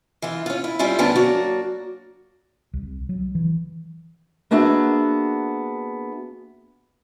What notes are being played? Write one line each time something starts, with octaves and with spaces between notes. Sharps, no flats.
E3 F4
C#4 F4
E4
G3 C#4 E4 F4 E5
D2 B3 C#4 D4 G#5 A5
F#3 A#3 D4 F#4
C2
F#3
E3
A#3 B3 D4 F#4 G#4 E5